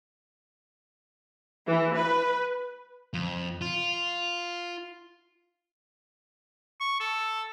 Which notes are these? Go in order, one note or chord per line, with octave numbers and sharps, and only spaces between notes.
E3
B4
F2
F4
C#6
A4